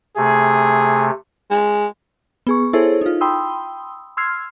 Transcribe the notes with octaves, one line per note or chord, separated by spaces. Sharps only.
C3 A3 G#4
G#3
B3 G#4 C#6
E4 G#4 A4 C5 C#5
D#4 F4
G5 B5 C6 D#6 E6
C6 E6 F6 G#6 C7